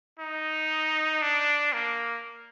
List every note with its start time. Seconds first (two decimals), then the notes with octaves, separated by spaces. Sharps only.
0.20 D#4
1.22 D4
1.73 A#3